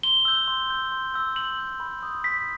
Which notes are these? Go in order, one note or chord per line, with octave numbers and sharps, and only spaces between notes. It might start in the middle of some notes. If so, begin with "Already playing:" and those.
C6 G7
E6 G6
C6
E6 G6
C6
E6 G6
C6 F#7
E6 G6
B5
D#6 G6
B5 B6